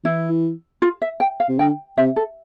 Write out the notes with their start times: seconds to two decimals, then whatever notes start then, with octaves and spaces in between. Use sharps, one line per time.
0.04 E3 E4
0.82 F4
1.02 E5
1.20 G5
1.40 F5
1.49 C3
1.59 D3 G5
1.98 C3 E5
2.16 A4